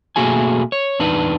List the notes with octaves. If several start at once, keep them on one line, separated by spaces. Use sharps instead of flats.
B2 A3 A#3 F#4 G#4 G#5
C#5
E2 D4 D#4 B4